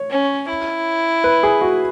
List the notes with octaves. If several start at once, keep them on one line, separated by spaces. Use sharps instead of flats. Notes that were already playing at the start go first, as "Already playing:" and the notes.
Already playing: C#5
C#4
E4
B4
G#4
F#4